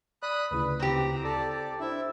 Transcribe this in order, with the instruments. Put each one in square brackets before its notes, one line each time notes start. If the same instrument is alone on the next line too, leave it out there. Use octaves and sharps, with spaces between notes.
[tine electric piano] D5 [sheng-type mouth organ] B5 D#6 F#6
[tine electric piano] D2 C#3 E4 [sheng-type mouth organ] B4
[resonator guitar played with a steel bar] C4 G4 [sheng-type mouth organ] A#5
[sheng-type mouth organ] A4 D5 [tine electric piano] D6
[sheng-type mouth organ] D5
[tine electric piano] D4 C5 [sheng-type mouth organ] E4 E5